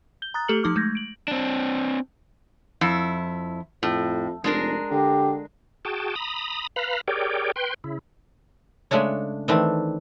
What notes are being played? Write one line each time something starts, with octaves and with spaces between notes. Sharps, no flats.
G6 G7
A#5 D#6 F#6 A6
A3 G4 A4 F6 C#7 F#7
F3 D#4 D6 F6
G#3 A3 G6 G#6 A#6
D7 F#7
C4 D4
F2 E4
F2 A2
F1 G#3 D4 A#4
D3 G4
F#4 G#4 G5 A5
A#5 B5 D#6
B4 F5 A#5 B5
G4 G#4 A#4 C#5 D5 G5
B4 G5 C6
C#3 E4
C#3 G#3 A3 D4 C#5
D#3 E3 A3 C4 D4